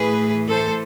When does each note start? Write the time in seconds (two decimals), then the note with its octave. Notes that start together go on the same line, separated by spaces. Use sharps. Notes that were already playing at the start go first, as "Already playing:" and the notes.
Already playing: A2 E3 A3 G#4 B4
0.49 A4 C5